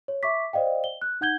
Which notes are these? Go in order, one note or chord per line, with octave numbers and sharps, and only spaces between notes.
C#5
E5 C#6 D6 B6
C5 D5 D#5 F5 G5
G7
F#6
D#4 F#5 G6 G#6 G7